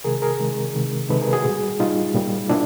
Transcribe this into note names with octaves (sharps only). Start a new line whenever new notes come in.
C3 D#3 G#3 G#4 A#4
G#4 A#4
C3 D#3 G#3
C3 D#3 G#3
C3 D#3 G#3 A4 B4
G#4 A#4
F#4 G#4
A#2
G3
A#2 G3 D#4 F4
A#2 G3
A#2 D4 E4